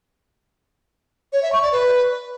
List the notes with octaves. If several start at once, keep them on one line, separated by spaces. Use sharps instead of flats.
C#5
E5
C#6
D5
B4